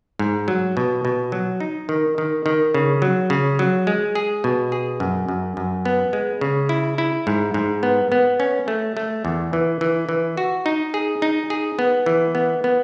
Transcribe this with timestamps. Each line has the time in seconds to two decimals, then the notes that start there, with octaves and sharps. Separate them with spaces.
0.19 G#2
0.48 F#3
0.77 B2
1.05 B2
1.32 F#3
1.60 D#4
1.89 D#3
2.18 D#3
2.46 D#3
2.74 C#3
3.02 F#3
3.30 C#3
3.59 F#3
3.87 G#3
4.15 G#4
4.44 B2
4.72 G#4
5.00 F#2
5.28 F#2
5.57 F#2
5.85 B3
6.13 G#3
6.41 C#3
6.69 E4
6.98 E4
7.27 G#2
7.54 G#2
7.83 B3
8.12 B3
8.40 C#4
8.68 A3
8.97 A3
9.25 E2
9.53 E3
9.81 E3
10.09 E3
10.37 F#4
10.66 D#4
10.94 G#4
11.22 D#4
11.50 G#4
11.79 B3
12.06 E3
12.35 B3
12.64 B3